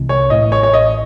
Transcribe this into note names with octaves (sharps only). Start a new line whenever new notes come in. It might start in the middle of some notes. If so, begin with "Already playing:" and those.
Already playing: C2 C3 E3 G#3
C#5
A1 A2 E3 D#5
C#5
C#5
D#5